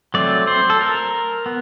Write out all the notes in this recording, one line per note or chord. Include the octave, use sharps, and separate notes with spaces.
F#3 A3 C4 D5
C5
A4
A#4
B3